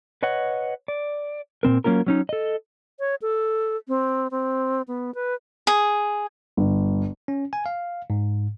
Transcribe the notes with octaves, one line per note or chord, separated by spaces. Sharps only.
B4 C#5 D#5 F#5
D5
A#2 C#3 C4 A#4
F#3 A#3 C#4 F4 A#4
F#3 C#4 D#4
A4 D#5
C#5
A4
C4
C4
B3
B4
G#4
G1
C#4
G#5
F5
G#2